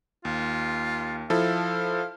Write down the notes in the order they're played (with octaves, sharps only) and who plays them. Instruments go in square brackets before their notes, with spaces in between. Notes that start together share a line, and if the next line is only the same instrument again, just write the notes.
[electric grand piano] D#2 [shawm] F4
[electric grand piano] F3 E4 A4 [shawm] F5